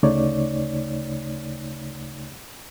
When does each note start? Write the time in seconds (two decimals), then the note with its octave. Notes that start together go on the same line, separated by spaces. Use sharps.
0.03 D2 C#3 A3 D#4 C#5 D5